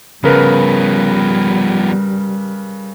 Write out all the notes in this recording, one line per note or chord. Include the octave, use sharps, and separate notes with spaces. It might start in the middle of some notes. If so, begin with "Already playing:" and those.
C#3 F3 G3 B3 A#4 B4